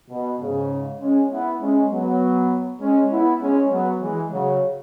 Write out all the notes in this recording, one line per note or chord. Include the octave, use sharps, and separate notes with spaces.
B2
G#2 C#3
G#3 C#4
B3 E4
G#3 C#4
F#3 B3
G#3 C#4
B3 E4
G#3 C#4
F#3 B3
E3 G#3
C#3 F#3